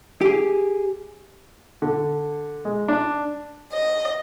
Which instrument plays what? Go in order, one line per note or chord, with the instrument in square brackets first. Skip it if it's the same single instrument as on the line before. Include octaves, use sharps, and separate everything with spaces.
[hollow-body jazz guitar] G4 G#4
[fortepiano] D3
G#3
D4
[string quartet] D#5